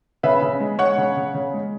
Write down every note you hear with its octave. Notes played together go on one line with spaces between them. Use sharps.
C#3 B4 E5
C#3
G#3
G#3 C#5 F#5
C#3
C#3
C#3
G#3